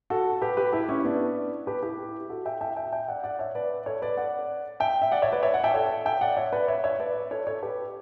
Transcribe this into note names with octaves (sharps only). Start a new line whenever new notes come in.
F#4 A4
G4 B4
G4 B4
E4 G4
C#4 E4
B3 D4
G4 B4
E4 G4
F#4 A4
E5 G5
E5 G5
E5 G5
E5 G5
D5 F#5
D5 F#5
C#5 E5
B4 D5
A4 C#5
B4 D5
D5 F#5
E5 G5
E5
D5 F#5
C#5 E5
B4 D5
C#5 E5
D5 F#5
E5 G5
A4 C#5
E5 G5
D5 F#5
C#5 E5
B4 D5
C#5 E5
C#5 E5
B4 D5
A4 C#5
A4 C#5
G4 B4